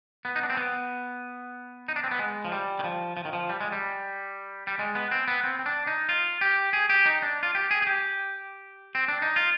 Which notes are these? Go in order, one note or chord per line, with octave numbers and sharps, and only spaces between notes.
B3
D#4
D4
C4
B3
D#4
D4
C4
B3
G#3
F3
G3
D#3
F3
F3
D#3
F3
G3
G#3
G3
G3
G#3
B3
C4
B3
C4
C4
D4
D#4
F4
G4
G#4
G4
D#4
D4
F4
G4
G#4
G#4
G4
C4
D4
D#4
F4